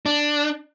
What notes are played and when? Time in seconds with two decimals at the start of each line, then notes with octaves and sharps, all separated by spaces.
0.06 D4